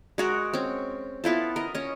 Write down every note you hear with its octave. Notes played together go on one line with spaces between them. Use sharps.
G#3 F#4 A#4
C4 C#4
B3 E4 F4 A4
A#4 D#5
C#4 D#5